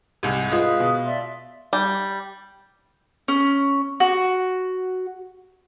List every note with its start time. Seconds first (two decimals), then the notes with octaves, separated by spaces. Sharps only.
0.23 C2 G#2
0.52 G#3 F4 B4 F5 D#6
0.80 B2
1.05 D5 E5 C6
1.73 G3
3.28 C#4
4.00 F#4